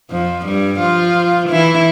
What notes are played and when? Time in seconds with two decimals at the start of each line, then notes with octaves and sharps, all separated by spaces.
0.11 F2 F3
0.45 G2 G3
0.80 F3 F4
1.50 E3 E4